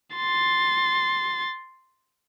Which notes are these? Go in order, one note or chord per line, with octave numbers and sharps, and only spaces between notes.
C6 A6